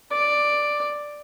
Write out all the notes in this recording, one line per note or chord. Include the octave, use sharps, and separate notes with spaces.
D5